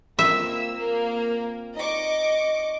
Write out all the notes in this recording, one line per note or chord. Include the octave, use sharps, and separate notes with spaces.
A#3 C4 F4 E5 A#5 E6
A#3
D#4 D5 D#5 C#6 D6